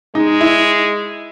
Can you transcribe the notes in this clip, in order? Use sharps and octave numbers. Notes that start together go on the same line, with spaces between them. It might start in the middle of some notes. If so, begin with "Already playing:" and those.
G#3 D#4
E4